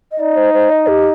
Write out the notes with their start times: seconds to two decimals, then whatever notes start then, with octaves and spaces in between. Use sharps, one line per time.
0.11 D#5
0.19 D#4 D5
0.36 C5
0.53 C5
0.70 D#5
0.87 G4